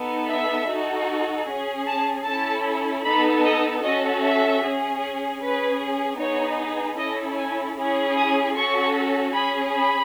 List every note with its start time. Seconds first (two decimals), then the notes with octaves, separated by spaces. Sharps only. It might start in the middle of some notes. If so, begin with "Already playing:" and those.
Already playing: B3 D#4 A4
0.30 E5
0.69 D#4 F#4 A4
1.48 C#4 G#4
1.87 A5
2.26 C#4 E4 A4 A5
3.05 B3 D#4 A4 B5
3.45 D#5
3.83 C#4 F#4 A4 D#5
4.23 E5
4.63 C#4 G#4
5.41 C#4 G#4 B4
6.20 B3 D#4 G#4 C#5
6.98 C#4 E4 A4 D#5
7.38 G#5
7.78 C#4 E4 G#4
8.16 D#6
8.56 C#4 F#4 A4 C#6
9.34 C#4 G#4 B5
9.73 B5